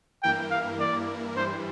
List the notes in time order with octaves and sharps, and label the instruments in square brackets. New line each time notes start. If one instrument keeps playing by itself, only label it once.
[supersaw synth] G2 E3 A#3 E4 A#4 [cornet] G5
[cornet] F5
D5
[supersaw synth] G2 E3 G3 [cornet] C5